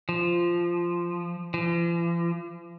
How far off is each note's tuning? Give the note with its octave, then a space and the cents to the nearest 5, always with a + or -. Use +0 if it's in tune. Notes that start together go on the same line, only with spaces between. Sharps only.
F3 -10
F3 -45